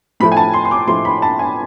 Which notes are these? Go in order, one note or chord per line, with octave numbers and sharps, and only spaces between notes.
A2 F3 A3 B5
G#5
A5
C6
C6
D6
A2 F3 A3 C6
B5
A5
G#5